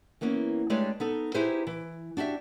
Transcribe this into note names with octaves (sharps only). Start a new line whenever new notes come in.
E3 A#3 B3 C#4
G#3 A3 D4 G4 B4 C#5
B3 D#4 A4
D#4 E4 G4 G#4 B4 C5
E3
D4 F#4 G4 E5